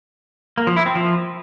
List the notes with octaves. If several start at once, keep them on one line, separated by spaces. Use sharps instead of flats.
A#3
F3
E4
C4
F3